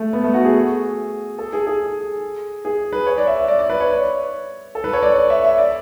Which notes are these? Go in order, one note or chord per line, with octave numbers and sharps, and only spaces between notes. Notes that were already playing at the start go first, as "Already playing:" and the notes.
Already playing: A3
B3
A3
F#4
G#4
A4
G#4
G#4
G#4
B4
C#5
D5
E5
D5
D5
B4
C#5
A4
B4
C#5
D5
D5
E5
E5
D5